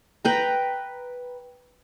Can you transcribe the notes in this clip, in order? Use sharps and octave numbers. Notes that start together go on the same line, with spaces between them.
B4 G5 A#5